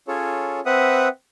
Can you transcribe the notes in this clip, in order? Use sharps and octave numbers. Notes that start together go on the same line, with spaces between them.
C#4 F4 G#4 A4 C#5
C4 B4 E5 F#5 D#6